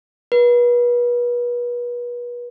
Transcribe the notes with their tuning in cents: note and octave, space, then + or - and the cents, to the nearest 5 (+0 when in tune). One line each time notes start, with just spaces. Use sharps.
B4 -35